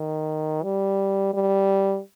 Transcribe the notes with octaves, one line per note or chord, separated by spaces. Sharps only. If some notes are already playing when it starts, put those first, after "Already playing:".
Already playing: D#3
G3
G3